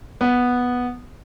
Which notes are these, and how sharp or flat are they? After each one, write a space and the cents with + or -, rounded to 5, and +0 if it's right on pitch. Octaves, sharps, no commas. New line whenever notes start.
B3 -5